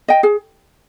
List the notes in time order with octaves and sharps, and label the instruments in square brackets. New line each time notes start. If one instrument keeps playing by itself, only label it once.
[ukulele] D#5 G5
G#4